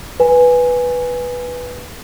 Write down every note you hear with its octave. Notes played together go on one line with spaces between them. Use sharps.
B4 G#5